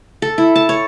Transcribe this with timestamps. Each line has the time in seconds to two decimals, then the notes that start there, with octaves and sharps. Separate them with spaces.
0.22 A4
0.38 E4
0.56 A5
0.69 C#5